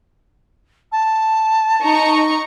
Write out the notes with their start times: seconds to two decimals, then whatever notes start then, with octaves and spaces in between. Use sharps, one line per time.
0.92 A5
1.83 D#4 A#5 C#6